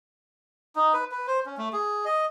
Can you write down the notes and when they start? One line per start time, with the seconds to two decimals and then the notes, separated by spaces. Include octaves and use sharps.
0.76 D#4
0.93 B4
1.11 B4
1.27 C5
1.46 C#4
1.58 A3
1.73 G#4
2.05 D#5